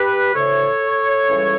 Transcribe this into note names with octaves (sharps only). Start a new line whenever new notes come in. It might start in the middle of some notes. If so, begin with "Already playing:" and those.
Already playing: G4 B4
D2 C#3 E3 A4 C#5
C#2 C#3 E3 G3